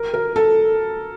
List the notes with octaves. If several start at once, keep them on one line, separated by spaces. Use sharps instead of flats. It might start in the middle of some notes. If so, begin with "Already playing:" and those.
Already playing: A#4
A#4
A4